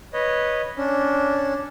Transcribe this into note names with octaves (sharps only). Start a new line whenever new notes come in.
B4 C#5 D#5
C#4 D4